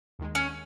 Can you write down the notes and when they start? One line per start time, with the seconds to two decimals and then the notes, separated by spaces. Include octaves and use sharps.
0.19 D#2 D#3 G#3
0.35 C#4